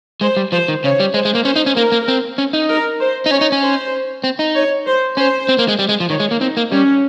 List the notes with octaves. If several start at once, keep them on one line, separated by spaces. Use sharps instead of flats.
G#3 C5
G3
F3 C5
D#3
C#3 C#5
G3
G#3 C5
G#3
A#3
C#4 C5
D#4
C#4
A#3 A#4
A#3
C4
C#4
D#4
A#4
C5
D#4
C#4 C#5
D#4
C#4
C5
C4
D#4
C#5
C5
C#4 C5
C4
A#3
G#3
G3
G#3
F3
D#3 C#5
G#3
A#3
C4 D#4
A#3
G3 C#4